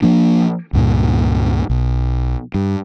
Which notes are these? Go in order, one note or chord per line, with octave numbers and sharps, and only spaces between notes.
F3 A#3 D4
C#2 G2 A#2
B1
G2